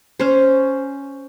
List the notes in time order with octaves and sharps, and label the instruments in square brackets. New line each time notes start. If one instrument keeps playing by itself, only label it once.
[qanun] C#4 C5